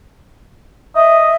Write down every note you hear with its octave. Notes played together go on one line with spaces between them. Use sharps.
D#5 E5